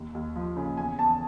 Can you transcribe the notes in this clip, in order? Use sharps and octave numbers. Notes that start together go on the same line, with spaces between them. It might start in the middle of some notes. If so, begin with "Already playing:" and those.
Already playing: D#2
D#2
F3
C#3
E2 G#5
E2 A5